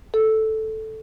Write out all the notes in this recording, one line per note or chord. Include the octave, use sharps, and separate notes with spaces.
A4